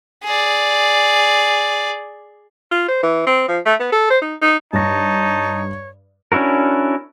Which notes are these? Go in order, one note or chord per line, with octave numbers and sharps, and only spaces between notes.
G#4 D5
F4
C5
E3
C4
F3
A3
B3
A4
C5
D#4
D#4
G2 D#4 C#5 A5 A#6
C#4 D4 E4 F#4 A#4